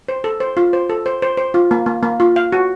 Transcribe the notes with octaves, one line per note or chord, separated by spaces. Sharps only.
C5
A4
C5
F4
C5
A4
C5
C5
C5
F4
A#3
A#3
A#3
F4
F5
F#4